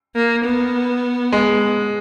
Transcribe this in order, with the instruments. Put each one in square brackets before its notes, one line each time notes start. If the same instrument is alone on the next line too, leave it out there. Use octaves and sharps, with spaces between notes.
[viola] A#3
B3
[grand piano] G#3